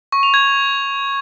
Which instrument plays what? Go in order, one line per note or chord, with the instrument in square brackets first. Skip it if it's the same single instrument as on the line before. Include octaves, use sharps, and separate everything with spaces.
[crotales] C#6
F7
G#6